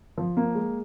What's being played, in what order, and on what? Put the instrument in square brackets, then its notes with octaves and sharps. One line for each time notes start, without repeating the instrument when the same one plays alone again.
[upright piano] F3
A#3
G#3